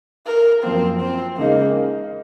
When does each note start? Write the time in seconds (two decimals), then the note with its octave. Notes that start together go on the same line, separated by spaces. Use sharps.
0.26 A#4
0.63 F#2 F3 A#3 C4
1.01 C4
1.38 C#3 G#3 A#3 D#4 G#4